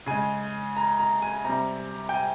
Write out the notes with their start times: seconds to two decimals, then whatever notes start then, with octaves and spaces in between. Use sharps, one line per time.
0.06 C#3 G#3 G#5
0.77 A#5
0.99 A#5
1.22 G#5
1.45 C3 G3 A#5
2.09 G5
2.14 G#5